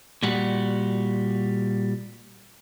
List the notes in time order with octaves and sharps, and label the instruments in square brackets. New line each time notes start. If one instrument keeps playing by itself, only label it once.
[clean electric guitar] A#2 G3 F#4